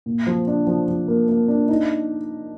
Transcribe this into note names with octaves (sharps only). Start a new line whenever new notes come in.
A#2
F3
D4
F3
F3
A#3
A#3
D4
D#4